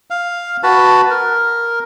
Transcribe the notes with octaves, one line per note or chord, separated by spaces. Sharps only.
F5
F#4 B4 A5
A#4